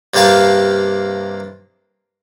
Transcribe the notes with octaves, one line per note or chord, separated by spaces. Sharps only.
G2 C3 A#3 G4 F5 A5